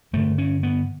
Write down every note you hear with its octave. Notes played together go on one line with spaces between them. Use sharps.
G2 D3 A3
C#4
B3